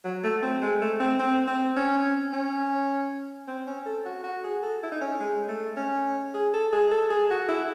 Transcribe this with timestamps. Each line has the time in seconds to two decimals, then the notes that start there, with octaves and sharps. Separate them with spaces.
0.04 F#3
0.23 A3
0.42 C4
0.62 G#3
0.81 A3
1.00 C4
1.19 C4
1.47 C4
1.76 C#4
2.33 C#4
3.48 C4
3.67 C#4
3.86 A4
4.06 F#4
4.24 F#4
4.44 G#4
4.63 A4
4.83 E4
4.92 D#4
5.01 C#4
5.20 G#3
5.48 A3
5.76 C#4
6.34 G#4
6.53 A4
6.73 G#4
6.92 A4
7.10 G#4
7.30 F#4
7.49 E4